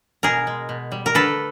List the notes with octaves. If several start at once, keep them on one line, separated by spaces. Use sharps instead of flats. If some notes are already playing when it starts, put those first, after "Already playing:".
B2 G#4 A#4
G#3
B2
G3
A#4
D3 A4 B4